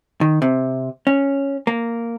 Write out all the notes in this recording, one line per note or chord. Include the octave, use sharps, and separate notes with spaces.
D#3
C3
C#4
A#3